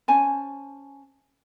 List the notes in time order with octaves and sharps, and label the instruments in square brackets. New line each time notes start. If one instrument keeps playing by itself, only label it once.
[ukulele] C#4 C5 G#5 A5